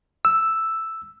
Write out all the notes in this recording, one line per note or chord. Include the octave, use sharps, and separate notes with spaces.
E6